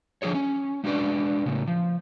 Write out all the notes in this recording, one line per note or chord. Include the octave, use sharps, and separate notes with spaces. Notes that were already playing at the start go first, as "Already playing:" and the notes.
D3 F3 G4 G#4 C#5
C#4
G#3 D4 F#4 B4 D5
A2 C#3
F3